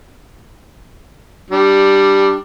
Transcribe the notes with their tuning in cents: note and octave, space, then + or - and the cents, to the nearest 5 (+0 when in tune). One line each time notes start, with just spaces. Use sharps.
G3 +0 D4 +5